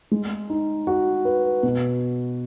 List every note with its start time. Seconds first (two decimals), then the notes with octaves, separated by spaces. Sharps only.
0.12 G#3
0.50 D#4
0.87 F#4
1.25 B4
1.63 B2